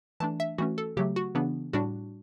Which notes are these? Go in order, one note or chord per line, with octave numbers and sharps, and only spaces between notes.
E3 A3 D4 A5
E5
E3 A3 C#4 F#4
A4
C#3 F#3 A3 G4
F#4
C#3 E3 B3 D4
A2 G3 D4 F#4